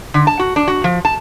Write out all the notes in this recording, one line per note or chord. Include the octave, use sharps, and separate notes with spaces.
D3
A5
F#4
D4
F#4
F3
A5